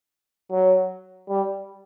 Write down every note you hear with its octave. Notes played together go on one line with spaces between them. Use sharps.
F#3
G3